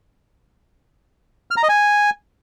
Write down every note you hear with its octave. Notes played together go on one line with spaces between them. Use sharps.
F6
A#5
D#5
G#5